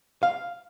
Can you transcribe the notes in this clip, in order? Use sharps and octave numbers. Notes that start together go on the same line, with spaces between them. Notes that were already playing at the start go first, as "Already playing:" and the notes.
F5